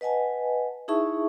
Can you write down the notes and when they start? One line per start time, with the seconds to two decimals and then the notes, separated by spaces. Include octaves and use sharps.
0.01 B4 D#5 F#5 G#5 A5
0.88 D#4 E4 G#4 E5 A5 C#6